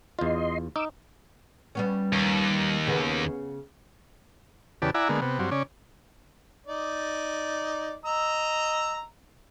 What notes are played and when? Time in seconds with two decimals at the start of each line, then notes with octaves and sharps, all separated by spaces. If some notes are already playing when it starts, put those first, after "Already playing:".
0.19 E2 F4 D#5 C6
0.76 D#4 D6 E6
1.75 G3 B3 C#4
2.13 D#2
2.87 C#3 B3
4.82 E2 C#3 G4 B4 D5 A5
4.94 E4 D5 E5 F#5 G#5 A#5
5.09 D3 G#3 A#3 B3
5.22 C3 B3
5.39 G2 F#3 C4
5.51 C#3 C#4 D5
6.67 D#4 D5
8.05 D#5 A#5 E6